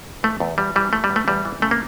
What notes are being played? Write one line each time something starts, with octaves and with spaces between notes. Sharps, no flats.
E3 A3
E2
E2 G3
E3 G3
E3 A3
G3
E2
A3
E2 G3
E3
C#3 A3
A#3